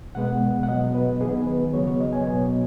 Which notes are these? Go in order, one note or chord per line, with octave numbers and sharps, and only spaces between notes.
B2 G#3 B3 F#5
F#5
B2 F#3 B3 D#5
B4
D#3 B3 G#4
B4
C#3 F#3 B3 C#5
C#5
D#5
G#5
B2 F#3 B3